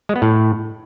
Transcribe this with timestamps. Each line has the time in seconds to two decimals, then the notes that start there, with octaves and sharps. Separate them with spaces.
0.09 G#3
0.16 B3
0.22 A2